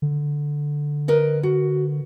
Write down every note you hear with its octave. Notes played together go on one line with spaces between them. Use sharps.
D3
A#4 B4 D#5
F#4